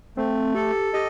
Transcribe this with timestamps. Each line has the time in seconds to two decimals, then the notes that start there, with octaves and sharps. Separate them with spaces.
0.17 A3 C4
0.55 G4 A4
0.94 G4 D#5